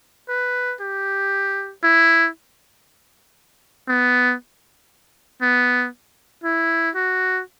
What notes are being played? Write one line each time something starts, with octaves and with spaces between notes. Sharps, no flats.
B4
G4
E4
B3
B3
E4
F#4